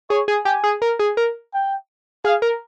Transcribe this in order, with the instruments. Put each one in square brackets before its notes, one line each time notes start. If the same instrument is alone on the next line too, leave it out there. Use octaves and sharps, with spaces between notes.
[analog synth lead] G#4 [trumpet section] C#5
[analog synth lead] G#4
[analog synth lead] G4 [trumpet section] G#5
[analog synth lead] G#4
A#4
G#4
A#4
[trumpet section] G5
[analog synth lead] G#4 [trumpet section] F5
[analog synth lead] A#4